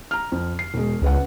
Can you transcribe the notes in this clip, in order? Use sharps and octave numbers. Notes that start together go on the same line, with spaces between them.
A#5 F6
F2
C7
E1 G#3
C#2 C#4 B4 F#5